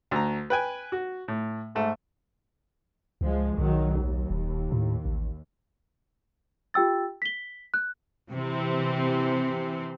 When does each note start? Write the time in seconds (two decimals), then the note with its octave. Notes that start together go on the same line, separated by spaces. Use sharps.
0.11 D2 A#5
0.50 B4 G5 G#5
0.92 F#4
1.28 A2
1.75 G#2 A3
3.21 C#2 F3 G#3
3.58 B1 D#3 F#3
3.97 D#2
4.30 D#1
4.72 A2
5.05 A1
6.74 F4 G4 G5 E6 A6
7.22 B6 G7
7.74 F#6
8.32 C3 E3 C4